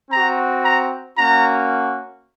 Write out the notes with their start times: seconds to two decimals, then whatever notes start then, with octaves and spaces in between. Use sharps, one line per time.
0.11 C4 F#4 A#5
0.64 A#5
1.17 A#3 C#4 F#4 A#5